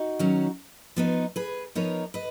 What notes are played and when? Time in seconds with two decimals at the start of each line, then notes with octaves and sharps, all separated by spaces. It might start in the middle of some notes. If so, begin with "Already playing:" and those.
Already playing: D#4 F#4
0.19 D#3 F#3 C#4
0.96 F3 B3 D#4
1.36 G#4 B4
1.75 F3 B3 D#4 A#4 C#5
2.14 B4 D#5